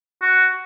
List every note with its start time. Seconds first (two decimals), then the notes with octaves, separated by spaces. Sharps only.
0.22 F#4